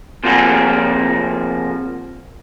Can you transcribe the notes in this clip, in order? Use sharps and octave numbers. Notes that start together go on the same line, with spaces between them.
C3 F3 A#3 F4 F#4 G#4